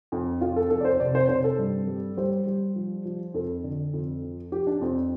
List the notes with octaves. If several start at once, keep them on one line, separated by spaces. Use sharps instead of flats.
F2
F2 F4
A4
F2 A4
D5
C5
C3 D5
C5
C3 C5
A4
G2
G3
G3 C5
G3
F3
F3
F2 A4
D3
F2
F3
F3 G4
D4
F2 C4